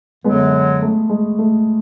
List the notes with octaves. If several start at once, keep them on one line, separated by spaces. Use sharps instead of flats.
F#2 D3 F#3 G#3 B3
A3
G#3
A3